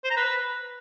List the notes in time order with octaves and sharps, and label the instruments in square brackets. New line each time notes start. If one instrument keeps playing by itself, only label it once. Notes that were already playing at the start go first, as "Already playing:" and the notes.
[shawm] C5
A#5
B4